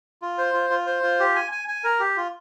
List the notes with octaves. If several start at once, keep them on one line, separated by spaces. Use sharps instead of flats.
F4
C5
F4
F4
C5
F4
G4
G#5
G#5
G#5
A#4
G4
F4